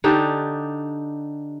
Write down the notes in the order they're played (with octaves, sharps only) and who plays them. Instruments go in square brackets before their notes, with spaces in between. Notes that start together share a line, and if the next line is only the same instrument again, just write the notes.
[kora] D3 D4 D#4 G4